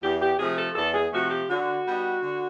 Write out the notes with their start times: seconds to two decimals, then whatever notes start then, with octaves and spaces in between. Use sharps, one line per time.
0.03 E2 G4
0.21 G4
0.39 C3 F3 A3 G#4
0.57 A4
0.75 E2 A4
0.94 G#4
1.13 C3 F3 A3 F#4
1.31 G4
1.49 D3 F#4
1.86 G3 B3 D#4
2.22 D3